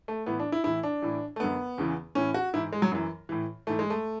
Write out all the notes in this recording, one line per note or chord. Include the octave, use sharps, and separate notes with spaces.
A3
A2 E3 B3
D4
E4
A2 E3 E4
D4
A2 E3
A3
F#2 D3 B3
E2 C#3 E3
A2 E3 C#4
F#4
G#2 E3 E4
G#3
F#3
F#2 E3
A2 E3
G#2 E3 A3
G#3
A3